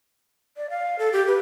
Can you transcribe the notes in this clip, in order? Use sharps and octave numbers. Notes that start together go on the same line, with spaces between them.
D5
F5
A4
G4
B4